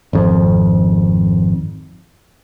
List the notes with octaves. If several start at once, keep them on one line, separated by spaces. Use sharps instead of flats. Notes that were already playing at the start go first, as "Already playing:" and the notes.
G#1 F2